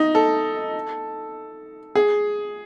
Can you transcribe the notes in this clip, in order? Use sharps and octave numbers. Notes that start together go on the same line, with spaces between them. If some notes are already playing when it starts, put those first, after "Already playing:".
Already playing: D#4
A4
G#4